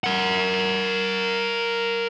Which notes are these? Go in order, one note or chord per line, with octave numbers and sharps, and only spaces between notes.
A#4 F#5